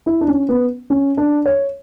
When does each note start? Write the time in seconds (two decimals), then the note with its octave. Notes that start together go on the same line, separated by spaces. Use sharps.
0.06 E4
0.21 D4
0.28 C#4
0.49 B3
0.90 C#4
1.17 D4
1.45 C#5